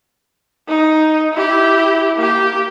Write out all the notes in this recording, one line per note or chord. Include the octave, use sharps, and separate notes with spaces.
D#4
E4 G4
A#3 G4